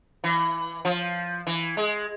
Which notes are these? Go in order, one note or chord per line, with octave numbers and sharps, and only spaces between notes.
E3
F3
E3
G#3